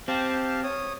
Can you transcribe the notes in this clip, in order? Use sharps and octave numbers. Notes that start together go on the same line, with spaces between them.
C4 G4 F5 A5
C#5 D#6